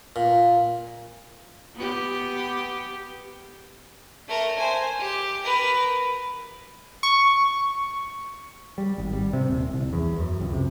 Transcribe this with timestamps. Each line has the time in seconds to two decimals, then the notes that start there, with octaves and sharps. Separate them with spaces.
0.16 A#2
1.76 B3 G4
4.28 A3 A#4
4.59 C5 G#5
4.99 G4
5.44 A#4 B4
7.03 C#6
8.78 G3
8.98 G#1
9.13 G3
9.33 C3
9.48 D#1
9.71 C2
9.93 E2
10.20 F#2
10.41 C#2
10.53 C3